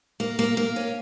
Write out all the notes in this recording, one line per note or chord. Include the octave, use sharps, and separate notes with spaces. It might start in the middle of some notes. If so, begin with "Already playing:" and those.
A#3
A#3
A#3
C#4